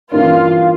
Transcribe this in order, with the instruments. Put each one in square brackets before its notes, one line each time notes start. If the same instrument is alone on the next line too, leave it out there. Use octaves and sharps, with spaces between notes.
[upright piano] G2 E3 A#3 C#4 [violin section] F4